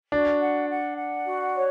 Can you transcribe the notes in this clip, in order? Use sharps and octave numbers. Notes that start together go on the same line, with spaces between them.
D4 F#4
F#5
F#5
F#5
F#4
C#5